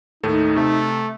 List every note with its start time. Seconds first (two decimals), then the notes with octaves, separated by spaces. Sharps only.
0.23 D#2 A2 A3 D#4
0.56 C3 A3